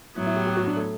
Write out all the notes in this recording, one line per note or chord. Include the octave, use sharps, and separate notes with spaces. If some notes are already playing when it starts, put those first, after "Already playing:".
A2 F#3 B3 E4
E4
G4
G4
F#4
D4
A3